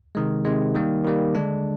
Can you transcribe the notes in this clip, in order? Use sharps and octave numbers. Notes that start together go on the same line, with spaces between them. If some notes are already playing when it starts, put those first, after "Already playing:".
C3 D#3 G#3
C3 D#3 G#3
D#3 G3 A#3
D#3 G3 A#3
D3 G#3 D4